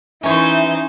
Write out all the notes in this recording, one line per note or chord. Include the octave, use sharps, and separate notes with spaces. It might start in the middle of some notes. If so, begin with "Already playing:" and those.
E3 C#4 D#4 C5 C#5 E5